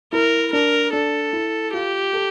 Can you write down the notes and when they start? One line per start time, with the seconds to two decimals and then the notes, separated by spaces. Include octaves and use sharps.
0.13 E4 A#4
0.53 D4 A#4
0.93 D4 A4
1.33 E4
1.73 F4 G4
2.13 A4